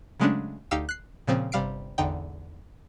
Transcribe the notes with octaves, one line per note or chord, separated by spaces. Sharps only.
C#3 F#3 G#3 A3 C#4 D4
D2 D#4 G4 F5 E6
F#6 C7
A#2 C#3 F3 C4
G1 C3 G3 F5 C7 D7
G#1 E2 D3 D#4 G5